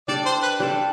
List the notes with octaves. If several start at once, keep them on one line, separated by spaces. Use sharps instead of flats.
G3 D4 A4 D5
C5
B4
G3 D4 A4